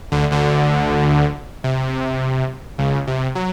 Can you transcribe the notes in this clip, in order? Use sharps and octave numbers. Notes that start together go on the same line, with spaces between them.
D2 D3
D2 D3
C3
C#2 C#3
C3
F#3